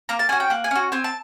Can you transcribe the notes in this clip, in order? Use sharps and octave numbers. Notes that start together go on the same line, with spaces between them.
A#3 A#5
A5
C#4 F#4 G#5
G5
A#3 F#5
G#5
C#4 F#4
C4 G#5
A5